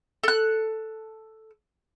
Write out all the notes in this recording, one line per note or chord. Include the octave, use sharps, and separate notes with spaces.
A4 F#6